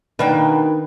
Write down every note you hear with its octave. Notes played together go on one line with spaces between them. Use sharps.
B2 D#3 A#3 D4 D#4 B4 G5